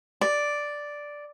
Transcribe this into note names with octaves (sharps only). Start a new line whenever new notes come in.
D5